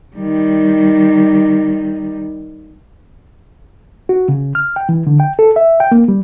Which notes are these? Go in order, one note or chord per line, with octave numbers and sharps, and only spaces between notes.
D#3 G3
F#4
C#3
F6
G5
E3
D3
G5
A4
E5
G5
A#3
G3